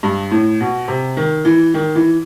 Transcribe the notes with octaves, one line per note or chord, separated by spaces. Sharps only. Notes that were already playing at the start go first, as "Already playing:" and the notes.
G2
A2
B2
C3
D#3
E3
D#3
E3